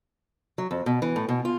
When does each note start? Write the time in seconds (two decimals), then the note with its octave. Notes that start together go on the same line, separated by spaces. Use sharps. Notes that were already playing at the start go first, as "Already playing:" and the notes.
0.58 F#3
0.71 F2
0.86 B2
1.02 E3
1.16 A2
1.29 B2
1.45 F4